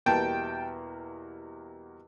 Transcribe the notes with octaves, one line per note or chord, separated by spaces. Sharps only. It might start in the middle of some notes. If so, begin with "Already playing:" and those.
E2 B2 G3 A#3 G5 A5